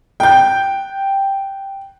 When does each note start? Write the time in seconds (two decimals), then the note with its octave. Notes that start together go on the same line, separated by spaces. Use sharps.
0.20 G5 G6